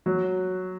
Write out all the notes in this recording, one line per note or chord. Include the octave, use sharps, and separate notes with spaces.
F#3